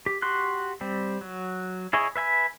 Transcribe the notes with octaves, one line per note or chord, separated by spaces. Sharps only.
G4
F#4 G4 C6 F#6
G3 C4
F#3
E4 G#4 C#5 D#5
B4 E5 G#5 B5